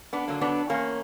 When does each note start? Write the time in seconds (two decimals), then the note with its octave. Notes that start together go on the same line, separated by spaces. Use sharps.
0.13 B3 D4
0.28 D3 F#3 A#3
0.41 B3 D4
0.69 E2 A#3 C#4